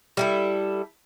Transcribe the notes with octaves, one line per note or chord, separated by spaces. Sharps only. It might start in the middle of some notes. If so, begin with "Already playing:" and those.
G3 E4 A4